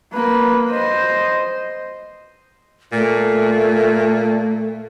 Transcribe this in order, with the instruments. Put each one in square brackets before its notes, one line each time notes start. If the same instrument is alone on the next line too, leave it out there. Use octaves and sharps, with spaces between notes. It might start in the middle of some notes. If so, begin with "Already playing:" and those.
[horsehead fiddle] A#3 B4
C5 D#5
[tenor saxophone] A#2 [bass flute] A3